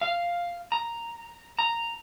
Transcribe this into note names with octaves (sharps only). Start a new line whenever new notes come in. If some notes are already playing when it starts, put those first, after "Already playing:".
F5
A#5
A#5